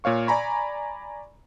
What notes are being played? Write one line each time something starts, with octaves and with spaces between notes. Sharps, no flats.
A#2 C#5 F5 C#6
D5 G#5 A#5 B5 C#6